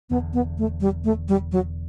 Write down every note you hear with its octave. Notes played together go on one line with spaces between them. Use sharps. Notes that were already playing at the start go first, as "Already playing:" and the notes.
E1 E2 D3 B3
B3
A3
G3
A3
G3
F#3